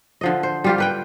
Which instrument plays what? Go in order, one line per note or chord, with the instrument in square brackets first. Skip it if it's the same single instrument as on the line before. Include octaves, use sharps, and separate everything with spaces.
[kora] D3 F3 D#5
C5
G3 F4 G4
G4 B4 G5